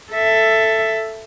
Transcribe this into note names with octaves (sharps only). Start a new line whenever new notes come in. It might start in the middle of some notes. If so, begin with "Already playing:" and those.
A4 E5